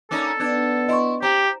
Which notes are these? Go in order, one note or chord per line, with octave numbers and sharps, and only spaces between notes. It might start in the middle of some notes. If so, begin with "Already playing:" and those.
A#3 C#4 D#4 A4
B3 D4 G#6
E4 D#5 C6 C#6
C4 G4 A#5